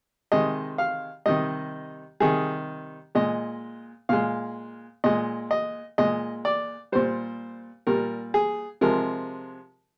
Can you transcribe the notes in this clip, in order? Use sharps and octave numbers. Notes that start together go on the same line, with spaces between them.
C3 D#3 G#3 D#5
F5
C3 D#3 G3 D#5
C3 D#3 G3 G#4
A#2 G#3 D#5
A#2 G#3 F5
A#2 G#3 D#5
D#5
A#2 G#3 D#5
D5
A#2 G3 C5
A#2 G3 A#4
G#4
C3 F3 G#3 A#4